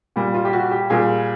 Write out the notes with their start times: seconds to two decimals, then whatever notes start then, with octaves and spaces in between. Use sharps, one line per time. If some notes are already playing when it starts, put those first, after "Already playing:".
0.16 A#2 G3
0.34 F4
0.45 G4
0.53 F#4
0.71 G4
0.90 A#2 G3 G#4